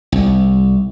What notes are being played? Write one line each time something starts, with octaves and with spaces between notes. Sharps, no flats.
C2